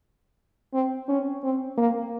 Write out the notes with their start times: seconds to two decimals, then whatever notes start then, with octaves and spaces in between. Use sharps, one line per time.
0.73 C4
1.09 C#4
1.44 C4
1.78 A#3